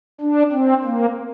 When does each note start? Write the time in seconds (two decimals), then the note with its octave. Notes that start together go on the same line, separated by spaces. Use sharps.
0.21 D4
0.52 C4
0.84 A#3